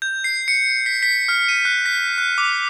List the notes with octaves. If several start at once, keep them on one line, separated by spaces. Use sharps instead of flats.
G6
C7
C#7
B6
B6
F6
D#7
F#6
B6
F#6
D6